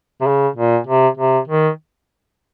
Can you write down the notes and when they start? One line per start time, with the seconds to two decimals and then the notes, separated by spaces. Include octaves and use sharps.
0.21 C3
0.27 C#3
0.56 A#2
0.87 C3
1.17 C3
1.48 D#3